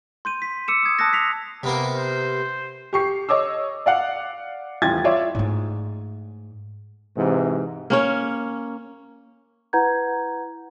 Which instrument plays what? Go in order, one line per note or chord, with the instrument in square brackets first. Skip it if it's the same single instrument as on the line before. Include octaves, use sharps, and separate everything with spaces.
[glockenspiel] C6 G6 D#7
B6
D6 E6 C#7 D#7 E7
D#6 G#6
A5 D#6 E6 F#6 A6 A#6
B6 C7 F7
[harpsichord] C3 B3 A#4 [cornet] A#3
[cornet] C5
[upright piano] G4 C#6 C7
C#5 D#5 D6 E6
D5 F5 F#5
D#1 A1 E3 F4 G#6 A6
E4 F4 C#5 D5 E5
[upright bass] G#2 A3
[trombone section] G#2 C3 E3
[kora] A#3 C#4 C#5
[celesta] E4 B4 F#5 A#5 G6 G#6